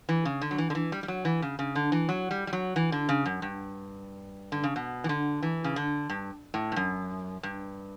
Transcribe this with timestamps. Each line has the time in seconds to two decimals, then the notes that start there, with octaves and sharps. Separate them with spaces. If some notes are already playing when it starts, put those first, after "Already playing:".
0.09 E3
0.25 C#3
0.42 D3
0.51 F#3
0.58 E3
0.70 D3
0.75 E3
0.92 G3
1.03 G3
1.08 F#3
1.25 E3
1.42 C#3
1.59 C#3
1.75 D3
1.92 E3
2.09 F#3
2.31 G3
2.47 G3
2.53 F#3
2.76 E3
2.92 D3
3.09 C#3
3.26 F#2
3.42 G2
4.52 D3
4.64 C#3
4.76 B2
5.04 E3
5.09 D3
5.43 E3
5.64 C#3
5.76 D3
6.09 G2
6.54 A2
6.72 G2
6.76 F#2
7.43 G2